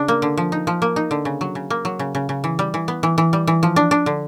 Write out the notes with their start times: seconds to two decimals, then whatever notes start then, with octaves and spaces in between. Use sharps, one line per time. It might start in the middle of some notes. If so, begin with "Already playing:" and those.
Already playing: C#3 D4
0.08 A#3
0.22 D3
0.37 F3
0.52 D#4
0.67 F3
0.82 A#3
0.96 D#4
1.11 D3
1.25 C#3
1.41 F#3
1.55 C#3
1.70 A#3
1.85 F#3
1.99 C#3
2.15 C#3
2.29 C#3
2.44 E3
2.59 G3
2.74 E3
2.88 B3
3.03 E3
3.18 E3
3.33 G3
3.47 E3
3.63 F3
3.76 D4
3.91 D4
4.06 D3